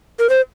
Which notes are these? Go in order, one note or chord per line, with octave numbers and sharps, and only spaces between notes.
A#4
C5